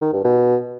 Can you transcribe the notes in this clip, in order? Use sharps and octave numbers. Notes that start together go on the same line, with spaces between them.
D#3
G2
B2